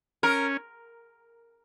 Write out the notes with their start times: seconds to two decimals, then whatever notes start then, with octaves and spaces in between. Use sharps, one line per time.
0.23 C#4 A#4